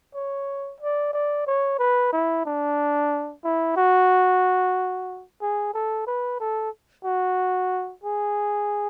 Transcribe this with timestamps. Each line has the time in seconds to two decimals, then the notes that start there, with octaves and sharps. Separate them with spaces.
0.15 C#5
0.80 D5
1.13 D5
1.47 C#5
1.79 B4
2.13 E4
2.45 D4
3.44 E4
3.76 F#4
5.42 G#4
5.74 A4
6.07 B4
6.40 A4
7.05 F#4
8.03 G#4